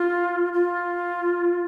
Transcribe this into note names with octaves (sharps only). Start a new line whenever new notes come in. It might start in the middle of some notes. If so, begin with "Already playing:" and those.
Already playing: F4
F4